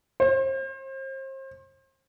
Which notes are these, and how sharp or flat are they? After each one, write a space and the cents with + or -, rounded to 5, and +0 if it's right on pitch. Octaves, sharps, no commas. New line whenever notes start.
C5 +35